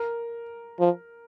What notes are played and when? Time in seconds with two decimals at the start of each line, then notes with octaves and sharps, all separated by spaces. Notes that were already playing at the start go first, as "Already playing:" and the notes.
Already playing: A#4
0.80 F3